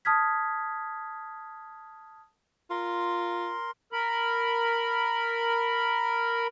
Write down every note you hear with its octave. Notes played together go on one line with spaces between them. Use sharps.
A5 D#6 F6 G#6 B6
F4 A#4 C6
A#4 B5